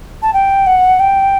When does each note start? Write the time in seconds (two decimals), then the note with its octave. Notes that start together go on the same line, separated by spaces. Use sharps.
0.22 A5
0.33 G5
0.66 F#5
0.99 G5